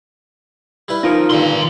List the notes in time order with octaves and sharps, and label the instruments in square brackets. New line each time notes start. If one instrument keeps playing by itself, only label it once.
[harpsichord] G3 E4 B4
[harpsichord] F3 [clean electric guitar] D#4 F4 A#4
[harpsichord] G2 A#2 D3 [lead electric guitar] D#3 C6